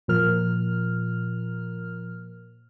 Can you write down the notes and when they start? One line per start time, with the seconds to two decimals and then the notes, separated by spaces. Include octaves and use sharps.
0.08 A#2 F3 A#4 F6